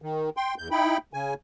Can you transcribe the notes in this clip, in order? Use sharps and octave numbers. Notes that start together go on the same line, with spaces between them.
D#3
G5 C6
E2 G6
D#4 E4 G5 B5
C#3 G#5